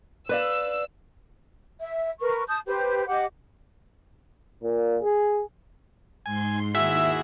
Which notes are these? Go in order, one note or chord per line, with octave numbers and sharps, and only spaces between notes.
B4 D5 F5 E6
E5
A#4 B4 C#6
A5 D#6 G6
G4 B4 C5
G4 D#5 F#5 D6
A#2
G#4
G#2 G#5 C6
D#2 E4 F#4 G#4 E5